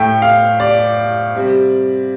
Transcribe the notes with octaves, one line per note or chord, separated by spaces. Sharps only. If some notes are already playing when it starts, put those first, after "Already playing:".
Already playing: A2 A3 G5
F5
D5
C3 G3